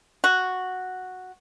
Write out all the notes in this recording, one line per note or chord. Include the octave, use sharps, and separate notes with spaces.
F#4